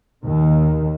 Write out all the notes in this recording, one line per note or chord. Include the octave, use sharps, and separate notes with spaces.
D#2 D#3